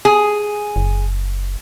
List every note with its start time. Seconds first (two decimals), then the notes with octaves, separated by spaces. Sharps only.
0.05 G#4
0.76 F#1